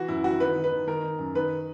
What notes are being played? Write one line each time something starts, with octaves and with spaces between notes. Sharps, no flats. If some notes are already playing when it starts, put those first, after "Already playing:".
Already playing: E3 F#4
F#2 E4
E3 F#4
D#3 B4
D#3
B4
D#3
D#3 A#4
D#3
F#2
D#3 B4